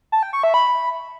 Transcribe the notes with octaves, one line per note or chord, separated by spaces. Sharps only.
A5
G5
C#6
E5
B5